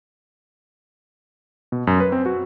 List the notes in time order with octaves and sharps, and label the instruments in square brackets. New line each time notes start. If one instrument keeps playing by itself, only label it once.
[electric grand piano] B2
F#2
B4
C4
F#4